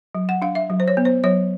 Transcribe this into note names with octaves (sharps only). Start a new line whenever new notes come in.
F#3
F#5
D4 F5
E5
F#3
C5
C#5
B3
C5
F#3 C#5